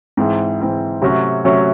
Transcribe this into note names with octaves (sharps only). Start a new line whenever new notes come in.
G#2 E3 C4 E4
G#2 E3 C4 E4
C3 F#3 A3 C#4 F#4
C3 F#3 A3 C#4 F#4